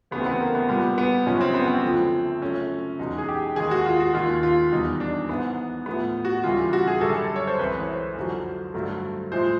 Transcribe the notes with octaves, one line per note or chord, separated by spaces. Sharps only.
D2 C#3 E3 A3 B3
C4
B3
A#3
B3
A#2 G3 B3
B3
F#2 C#3 F3 G#3 C#4
C4
B3
C4
D2 D3 F3
F#2 C#3 F3 A3 C#4
E2 B2 G#3 D#4
G#4
G4
D#2 D#3 G#3 G#4
F#4
F4
F#4
D#2 D#3 G#3 F4
F4
E2 B2 G3 D#4
D4
G#2 E3 G#3 B3
A2 F3 A3 B3
F#4
D2 C#3 E3 G3 F4
F#4
G#4
F#2 D3 G3 A4
C#5
C5
C2 C3 E3 G#3 B4
C#5
C5
F2 D3 F#3
G2 D3 F#3 A3
A2 F3 G#3 C5